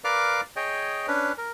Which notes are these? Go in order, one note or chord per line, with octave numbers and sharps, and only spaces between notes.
A#4 B4 D5 F5 D6 F6
G#4 C#5 D#5 G5
C#4 D4 B4
A#4